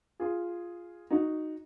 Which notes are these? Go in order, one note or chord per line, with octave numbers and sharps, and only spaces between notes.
F4 G#4
D#4 F#4